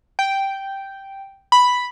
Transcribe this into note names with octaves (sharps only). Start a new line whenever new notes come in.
G5
B5